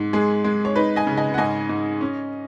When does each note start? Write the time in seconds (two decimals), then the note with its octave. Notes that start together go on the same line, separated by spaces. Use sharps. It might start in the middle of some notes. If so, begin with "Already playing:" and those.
Already playing: G#2
0.13 G#3 G#4
0.44 G#3
0.65 C#5
0.76 D#4 B4
0.96 D#5 G#5
1.07 C#3
1.17 D#5 G#5
1.34 F#5
1.38 G#2 D#5 G#5
1.69 G#2
2.01 C#4